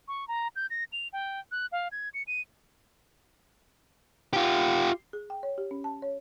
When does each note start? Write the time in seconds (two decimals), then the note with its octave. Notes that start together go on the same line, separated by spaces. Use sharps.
0.08 C#6
0.28 A#5
0.56 G6
0.70 A#6
0.92 F7
1.13 G5
1.52 F#6
1.72 F5
1.92 G#6
2.14 C#7
2.27 D#7
4.33 F4 G4
5.13 G#4
5.30 G5
5.43 C#5
5.58 G4
5.71 C#4
5.84 A5
6.02 C#5